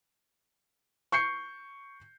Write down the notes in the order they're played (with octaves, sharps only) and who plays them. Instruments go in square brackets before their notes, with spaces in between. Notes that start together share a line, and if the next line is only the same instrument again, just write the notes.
[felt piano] C#6 G6 C7 C#7